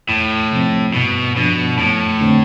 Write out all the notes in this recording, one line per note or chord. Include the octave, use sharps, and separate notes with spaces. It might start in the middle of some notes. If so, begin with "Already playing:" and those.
E2 A2
C3 F3 C4
G2 B2
B2 F3 B3 D4
F2 A2
D3 A3 C4